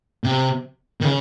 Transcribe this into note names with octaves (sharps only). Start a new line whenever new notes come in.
C3
D#3
C#3